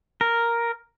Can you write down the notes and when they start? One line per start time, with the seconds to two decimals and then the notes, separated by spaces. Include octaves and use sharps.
0.21 A#4